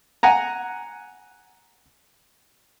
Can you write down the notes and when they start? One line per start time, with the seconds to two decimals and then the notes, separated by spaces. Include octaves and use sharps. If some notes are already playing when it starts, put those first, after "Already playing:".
0.23 F#5 G#5 A#5